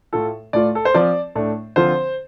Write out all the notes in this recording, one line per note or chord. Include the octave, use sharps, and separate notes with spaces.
A2 A3 F4 A4
A2 A3 F4 D5
A4
C5
F3 C4 F4 D5
A2 A3 D4
D3 F3 C4 F4 C5